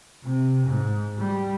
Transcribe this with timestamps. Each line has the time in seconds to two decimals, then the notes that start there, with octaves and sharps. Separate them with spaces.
0.24 C3
0.66 G#2
1.19 G3